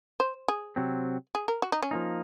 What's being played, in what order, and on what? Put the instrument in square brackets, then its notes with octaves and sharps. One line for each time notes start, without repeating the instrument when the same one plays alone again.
[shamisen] C5
G#4
[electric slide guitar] C3 F#3 C4
[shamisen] G#4
A#4
F#4
D#4
C#4
[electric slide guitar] F3 A#3 D#4